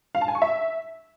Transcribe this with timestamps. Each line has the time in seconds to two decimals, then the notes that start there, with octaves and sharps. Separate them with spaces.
0.15 F5
0.21 A5
0.28 G#5
0.35 C#6
0.42 E5